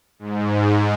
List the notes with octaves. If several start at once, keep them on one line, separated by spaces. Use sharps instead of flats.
G#2